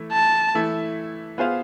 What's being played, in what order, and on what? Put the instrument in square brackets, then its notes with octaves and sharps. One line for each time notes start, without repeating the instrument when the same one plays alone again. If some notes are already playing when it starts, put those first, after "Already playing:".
Already playing: [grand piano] E3 A3 E4
[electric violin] A5
[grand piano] E3 A3 E4
B3 F4 G#4 C5 F5